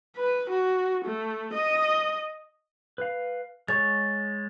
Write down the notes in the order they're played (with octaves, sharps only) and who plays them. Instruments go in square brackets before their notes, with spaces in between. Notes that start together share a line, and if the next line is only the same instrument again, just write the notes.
[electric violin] B4
F#4
A3
D#5
[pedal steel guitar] B4 F5
[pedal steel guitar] G#3 C#5 C#6 [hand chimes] A6